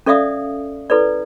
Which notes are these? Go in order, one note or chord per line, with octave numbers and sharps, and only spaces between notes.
C#4 A4 D5 E5 F5 D#6
E4 A4 B4 D5